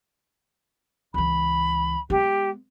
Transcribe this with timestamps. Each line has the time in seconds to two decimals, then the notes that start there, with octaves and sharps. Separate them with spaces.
1.14 C#2 E3 B5
2.10 G#3 B3 G4